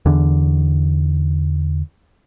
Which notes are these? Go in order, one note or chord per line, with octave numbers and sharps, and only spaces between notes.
E2 D3